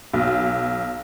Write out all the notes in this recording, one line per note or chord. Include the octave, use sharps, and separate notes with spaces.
B1